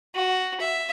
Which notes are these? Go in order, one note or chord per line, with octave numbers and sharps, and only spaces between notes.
F#4
E5